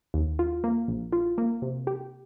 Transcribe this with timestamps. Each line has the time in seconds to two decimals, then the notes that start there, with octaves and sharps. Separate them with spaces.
0.14 D#2
0.39 F4
0.64 A#3
0.88 A#1
1.13 F4
1.38 A#3
1.62 C3
1.87 G4